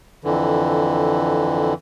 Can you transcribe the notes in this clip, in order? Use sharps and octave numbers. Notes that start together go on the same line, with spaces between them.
F2 D3 E3